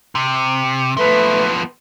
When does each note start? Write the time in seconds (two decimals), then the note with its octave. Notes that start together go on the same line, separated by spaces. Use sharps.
0.15 C3
0.97 F3 A3 B3 B4